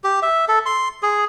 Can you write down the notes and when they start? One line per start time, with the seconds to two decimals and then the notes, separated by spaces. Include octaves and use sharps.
0.04 G4
0.22 E5
0.48 A4
0.66 C6
1.03 G#4